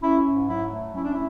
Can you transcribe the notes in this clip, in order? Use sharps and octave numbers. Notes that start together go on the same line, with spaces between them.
C#4 E4
G#2
F#3 E4
A3
C#4 E4
D4
E4